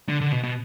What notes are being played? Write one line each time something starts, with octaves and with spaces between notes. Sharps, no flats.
D3
D3
B2
B2